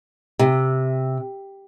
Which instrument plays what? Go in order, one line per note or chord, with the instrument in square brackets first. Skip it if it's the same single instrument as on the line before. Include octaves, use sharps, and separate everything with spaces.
[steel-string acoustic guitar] C3